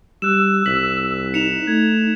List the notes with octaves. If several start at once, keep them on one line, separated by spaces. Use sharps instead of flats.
G3 E6 F#6 E7
C2 B6 F#7
D#4 C#7 E7 F7
A3 G#6